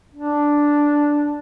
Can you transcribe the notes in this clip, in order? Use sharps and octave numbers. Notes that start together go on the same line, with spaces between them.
D4